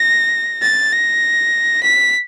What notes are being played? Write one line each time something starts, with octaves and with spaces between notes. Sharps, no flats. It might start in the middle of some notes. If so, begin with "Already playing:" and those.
Already playing: A#6
A6
A#6
B6